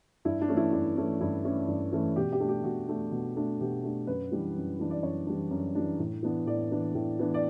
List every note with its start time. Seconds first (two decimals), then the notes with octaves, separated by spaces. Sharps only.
0.25 G2 E4
0.41 D4
0.49 E3 A3 C#4
0.57 E4
0.73 G2 D4
0.96 E3 A3 C#4
1.21 G2 E4
1.45 E3 A3 C#4
1.68 G2
1.92 E3 A3 C#4
2.16 B2 G4
2.32 G4
2.40 A3 D4
2.49 G4
2.64 B2 F#4
2.89 A3 D4
3.12 B2
3.36 A3 D4
3.60 B2 G4
3.83 A3 D4
4.07 F#2 B4
4.32 E3 G3 D4
4.56 F#2
4.79 E3 G3 D4
4.91 D5
5.03 F#2 C#5
5.27 E3 G3 D4
5.51 F#2
5.75 E3 G3 D4
6.00 A2
6.23 E3 B3 D4
6.47 A2 D5
6.71 E3 B3 D4
6.95 A2
7.19 E3 B3 D4
7.34 D5